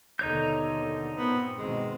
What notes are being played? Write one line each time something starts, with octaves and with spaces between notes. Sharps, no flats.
D#2 B2 D3 D#4 C#5 G6
G2 A#2 B3 C4
B2 D#3 G#3 C4